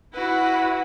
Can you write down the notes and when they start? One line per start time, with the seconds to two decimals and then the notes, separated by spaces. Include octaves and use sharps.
0.14 E4 F#4 B4 F#5